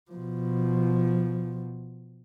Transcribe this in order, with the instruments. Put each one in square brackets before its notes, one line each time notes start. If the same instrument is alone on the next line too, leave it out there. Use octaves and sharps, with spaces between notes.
[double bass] B2 F3